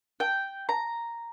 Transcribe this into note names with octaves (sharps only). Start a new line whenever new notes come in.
G5
A#5